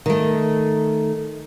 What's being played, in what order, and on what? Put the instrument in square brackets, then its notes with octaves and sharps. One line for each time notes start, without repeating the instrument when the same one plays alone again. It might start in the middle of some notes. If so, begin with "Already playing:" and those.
[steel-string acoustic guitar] D#3 A3